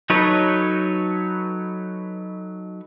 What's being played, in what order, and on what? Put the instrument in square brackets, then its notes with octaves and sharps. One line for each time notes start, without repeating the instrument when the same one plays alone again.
[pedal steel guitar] F#3 D#4 A4 B4 C#5